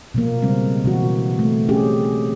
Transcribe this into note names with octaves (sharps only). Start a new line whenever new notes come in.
B2 F3 A#3
C#3 G3 G#3 C4
G3
B2 E3 F#4
A3
C4 C#4 G4 G#4